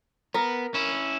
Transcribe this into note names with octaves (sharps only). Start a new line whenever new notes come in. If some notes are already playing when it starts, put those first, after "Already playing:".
B3 A#4
C#4 E4